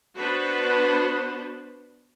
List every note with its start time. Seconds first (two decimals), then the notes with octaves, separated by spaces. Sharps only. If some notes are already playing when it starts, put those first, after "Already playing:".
0.17 B3 D4 F#4 B4 C5